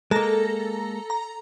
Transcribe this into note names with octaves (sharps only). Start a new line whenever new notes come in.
G#3 A#3 A4 A#5 A#6
A#5